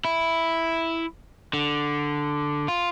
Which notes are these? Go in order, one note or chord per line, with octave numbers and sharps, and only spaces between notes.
E4
D3
F4